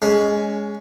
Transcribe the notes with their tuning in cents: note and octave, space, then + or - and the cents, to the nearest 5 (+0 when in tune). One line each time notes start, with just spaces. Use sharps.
G#3 +0 C#4 +15